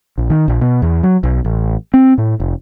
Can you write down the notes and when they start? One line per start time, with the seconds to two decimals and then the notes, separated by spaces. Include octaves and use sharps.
0.18 A#1
0.30 D#3
0.48 A#1
0.61 B2
0.82 E2
1.03 F#3
1.23 B1
1.45 A1
1.94 C4
2.18 A2
2.40 F1